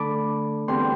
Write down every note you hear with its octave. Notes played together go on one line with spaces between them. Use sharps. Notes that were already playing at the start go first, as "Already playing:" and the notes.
Already playing: D3 A3 A5 B5 D6
E2 D3 G3 C4 C6